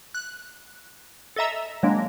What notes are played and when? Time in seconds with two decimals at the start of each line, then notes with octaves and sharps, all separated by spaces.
0.14 F#6
1.36 A4 D#5 E5 A#5 E6
1.83 F#3 G#3 A#3 D4